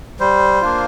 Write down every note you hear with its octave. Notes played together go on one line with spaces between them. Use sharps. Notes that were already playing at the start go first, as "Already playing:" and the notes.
G3 C5
A#3 D4 F4